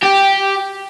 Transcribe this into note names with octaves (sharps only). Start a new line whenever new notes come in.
G4